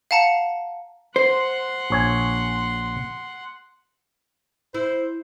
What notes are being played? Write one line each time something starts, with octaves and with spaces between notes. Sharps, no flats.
F5 F#5 A5 A#5 C#7
C5 F#5 C6
A#1 C#5 G#5
E4 C5